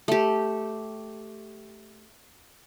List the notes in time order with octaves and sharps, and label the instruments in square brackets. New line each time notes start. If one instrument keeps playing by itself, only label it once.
[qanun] A3 G4